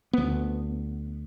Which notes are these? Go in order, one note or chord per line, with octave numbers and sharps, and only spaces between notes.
D2 B3